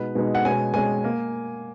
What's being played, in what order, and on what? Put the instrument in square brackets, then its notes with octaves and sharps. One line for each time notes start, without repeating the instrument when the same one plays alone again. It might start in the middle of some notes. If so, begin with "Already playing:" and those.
Already playing: [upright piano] B2 G#3 B3 D#4 B4
B2 G#3 B3 D#4
F#5
B2 G#3 C#4 G#5
B2 G#3 C#4 G#5
A#3